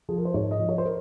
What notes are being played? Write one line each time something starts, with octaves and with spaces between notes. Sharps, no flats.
F3 G#4
A#4
C5
G#2 C#5
D#5
F3
C#5
C5
A#4